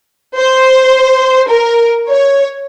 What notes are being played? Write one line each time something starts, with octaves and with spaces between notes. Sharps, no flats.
C5
A#4
C#5